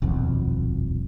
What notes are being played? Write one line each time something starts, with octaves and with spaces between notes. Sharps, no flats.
D#1 B1 F2